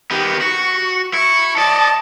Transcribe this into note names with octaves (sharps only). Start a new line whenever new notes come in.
D#3 B3 G4
F#4 C#6
E4 C#6
D5 D#5 A5